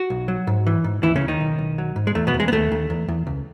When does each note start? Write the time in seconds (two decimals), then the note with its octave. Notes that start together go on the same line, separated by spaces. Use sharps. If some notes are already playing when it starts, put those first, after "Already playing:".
Already playing: F#4
0.10 B1
0.28 F#3
0.47 G#2
0.67 E3
0.84 G#2
1.03 D#2 E3 E4
1.16 C#3 C#4
1.21 D#2
1.28 D#3 D#4
1.41 B1
1.59 B1
1.78 F#3
1.96 G#2
2.07 G#3
2.15 E2 A3
2.27 B2 B3
2.34 E2
2.40 G#3
2.48 B3
2.52 D#2 A3
2.72 D#2
2.90 E2
3.08 E2
3.27 C#2